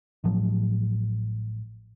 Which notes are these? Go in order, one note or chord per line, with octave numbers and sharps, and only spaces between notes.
A1 A2 F3 F#3